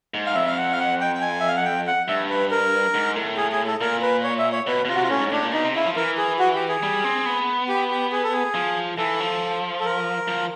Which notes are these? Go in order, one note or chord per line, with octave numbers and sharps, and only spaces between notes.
G#2
F5
F2 E5
F5
F#5
F5
F#5
G5
G5
G#5
E5
F5
F#5
G5
F#5
G2 E5
B4
A#4
G#2
A2
G#4
G#4
A4
A#2 A#4
B4
C#5
E5
C#5
B2 B4
B2
C3 F4
F#4
F4
A2 C#4
G#2
A2 D4
A#2
B2 D#4
C3
C#3 E4
F3
E3 A#4
G#4
F#4
G4
G#4
G3
C4
B3
G4
G4
G#4
A4
G#4
F3
E3 A4
F3
A4
A#4
F3